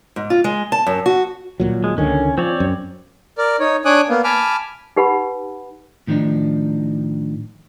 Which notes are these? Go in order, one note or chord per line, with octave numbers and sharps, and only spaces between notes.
G#2
F4
G#3
A5
F#2
F#4
D#1 A#2 F#3
G#3
C#2 D3 D#3 C#4
F3 C4 C#5 D5
F#2
A#4 D5
D#4 C#5
D4 C#5 G#5 D6 D#6 F#6
A#3 B3
G#5 A5 B5 D6 F6
D#4 G4 B4 F#5 B5
A2 D#3 F3 A3 D4 D#4